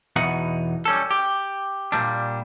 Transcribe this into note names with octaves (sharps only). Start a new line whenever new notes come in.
E2 B2 D#4 F#5
G3 C#4 A4
G4
A#2 G3 D4